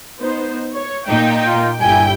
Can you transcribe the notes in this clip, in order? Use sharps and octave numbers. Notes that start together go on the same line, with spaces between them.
B3 D#4 C5
C#5
A#2 D#4 G5
F4
G1 G3 E4 G4 G5 G#5